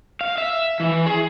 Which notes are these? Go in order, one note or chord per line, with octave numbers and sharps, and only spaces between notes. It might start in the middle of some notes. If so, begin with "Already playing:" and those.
F5
E5
E3
G#4